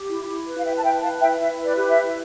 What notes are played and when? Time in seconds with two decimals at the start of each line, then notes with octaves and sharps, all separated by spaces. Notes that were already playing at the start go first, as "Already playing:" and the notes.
Already playing: G4
0.09 E4
0.27 E4
0.46 B4
0.58 F5
0.64 E4 E5 G5
0.77 A5
0.84 B4 E5 G5
1.02 B4 F5 A5
1.21 E4 E5 G5
1.39 E4 E5
1.59 B4
1.65 D5
1.77 G4
1.90 E5
1.97 E4